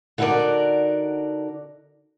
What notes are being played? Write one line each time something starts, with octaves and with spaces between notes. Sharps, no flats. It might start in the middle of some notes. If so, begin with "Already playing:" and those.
D3 D#4 E4 F#4 A#4 D5